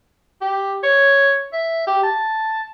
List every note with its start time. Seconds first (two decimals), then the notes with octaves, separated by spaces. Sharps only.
0.41 G4
0.83 C#5
1.53 E5
1.87 G4
2.03 A5